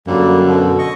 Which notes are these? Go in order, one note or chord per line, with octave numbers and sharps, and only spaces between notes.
F#2 D3 G3 A#3
B2 D3
D#5 C#6